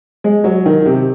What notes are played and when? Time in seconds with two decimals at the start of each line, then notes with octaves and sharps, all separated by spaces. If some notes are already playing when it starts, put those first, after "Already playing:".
0.24 G#3
0.44 F#3
0.66 D#3
0.86 C3